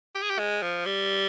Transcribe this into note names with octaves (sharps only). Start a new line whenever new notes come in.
G4
G#4
G4
G#3
F3
G3